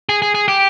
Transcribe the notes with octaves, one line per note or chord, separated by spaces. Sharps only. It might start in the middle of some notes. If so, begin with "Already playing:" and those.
G#4
G#4
G#4
G4